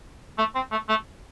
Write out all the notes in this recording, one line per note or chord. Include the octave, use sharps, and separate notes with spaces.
A3
C4
A3
A3